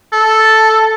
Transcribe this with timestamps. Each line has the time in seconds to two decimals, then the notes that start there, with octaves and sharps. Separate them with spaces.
0.13 A4